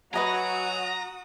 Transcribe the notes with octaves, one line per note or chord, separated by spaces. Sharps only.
F#3 F#4 B4 D#5 G#5 A#5 D#6